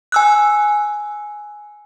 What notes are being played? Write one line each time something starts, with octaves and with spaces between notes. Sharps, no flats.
G#5 E6 F#6